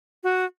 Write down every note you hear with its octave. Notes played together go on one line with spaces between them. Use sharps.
F#4